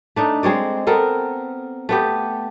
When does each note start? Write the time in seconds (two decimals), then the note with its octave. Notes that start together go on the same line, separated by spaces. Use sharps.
0.16 A3 D4 D#4
0.43 G#3 C4 C#5 D5
0.87 B3 C4 A4 A#4
1.89 A3 B3 G4